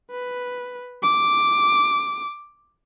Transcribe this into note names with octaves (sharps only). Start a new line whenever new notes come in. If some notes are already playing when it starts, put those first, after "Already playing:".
B4
D6